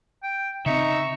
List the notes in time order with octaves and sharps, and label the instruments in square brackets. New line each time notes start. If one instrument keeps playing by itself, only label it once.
[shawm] G5
[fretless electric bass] C#3 C4 [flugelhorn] D#4 [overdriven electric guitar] E5 [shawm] C#6